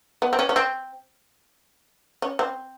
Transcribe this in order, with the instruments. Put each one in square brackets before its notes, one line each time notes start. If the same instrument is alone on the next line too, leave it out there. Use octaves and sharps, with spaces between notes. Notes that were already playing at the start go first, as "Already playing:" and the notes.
[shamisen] B3
C4
C#4
C#4
C4
C#4
C4